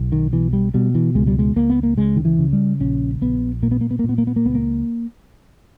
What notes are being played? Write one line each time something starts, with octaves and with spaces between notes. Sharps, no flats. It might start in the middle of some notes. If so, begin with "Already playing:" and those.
Already playing: B1
D#3
B2 E3
G3
B2 G3
E3
C#2 G#3
G3
G#3
C#2 A#3
B3
A#3
C#3 G#3
D#3
E3
C#3
G3
A#1 C#4
A#1 B3
A#2 A#3
B3
A#3
B3
A#3
A#2
B3
A#3
B3
A#3
C#2 B3
A#3